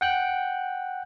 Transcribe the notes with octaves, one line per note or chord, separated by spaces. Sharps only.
F#5 G5 F#6